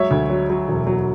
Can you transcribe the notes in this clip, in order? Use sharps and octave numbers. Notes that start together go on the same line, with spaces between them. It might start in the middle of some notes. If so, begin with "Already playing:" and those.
Already playing: F#3 G#3 C#5 E5
D2
F#3
F#3
E1
F#3